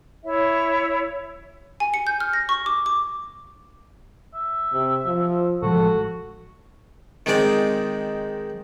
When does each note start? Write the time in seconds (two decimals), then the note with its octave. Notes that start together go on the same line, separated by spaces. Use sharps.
0.25 E4 C#5 E5
1.80 G#5
1.94 C#7
2.07 G6
2.20 F6
2.33 A#6
2.49 C#6
2.66 D6
2.86 D6
4.34 E5
4.72 C3
5.05 F3
5.62 A1 F3 G#3 F#4 A4
7.26 D#3 G#3 C4 D5